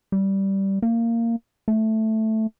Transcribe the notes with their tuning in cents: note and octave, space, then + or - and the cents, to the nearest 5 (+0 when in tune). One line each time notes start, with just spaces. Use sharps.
G3 -10
A#3 -15
A3 +0